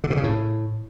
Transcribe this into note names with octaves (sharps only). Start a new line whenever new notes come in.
D3
B2
C#3
A2